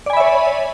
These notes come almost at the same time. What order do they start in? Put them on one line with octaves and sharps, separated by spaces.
D5 G#5 B5 E5 C#5